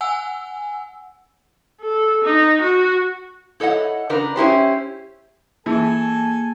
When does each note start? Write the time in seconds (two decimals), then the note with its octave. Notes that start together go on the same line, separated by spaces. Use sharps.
0.01 F#5 G#5 E6
1.81 A4
2.24 D#4
2.61 F#4
3.60 E4 A4 C#5 D#5 F#5
4.10 C#3 D4 A#4 B4
4.36 C#4 E4 G4 C5
5.66 E3 A#3 G#4 A4 G#5 A5